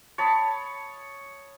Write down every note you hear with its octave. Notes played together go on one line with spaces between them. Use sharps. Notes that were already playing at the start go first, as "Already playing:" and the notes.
C#5 A5 B5 D#6